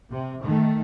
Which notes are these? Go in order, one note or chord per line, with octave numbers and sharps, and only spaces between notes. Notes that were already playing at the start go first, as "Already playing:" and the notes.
C3
D#3 A3